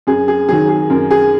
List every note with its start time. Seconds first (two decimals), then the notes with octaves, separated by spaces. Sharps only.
0.07 F#2 G#4
0.28 G#4
0.49 D#3 F#3 G#4
0.69 G#4
0.90 F#2 A#4
1.11 G#4